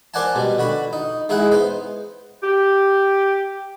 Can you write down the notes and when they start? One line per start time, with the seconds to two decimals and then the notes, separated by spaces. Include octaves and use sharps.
0.14 A#4 C5 D5 F#5 G#5 A5
0.35 B2 G3
0.59 D3 F#4 B5
0.93 D#4
1.29 G#3 D#4 E4 G#4 F#5
1.51 B3 C5
2.42 G4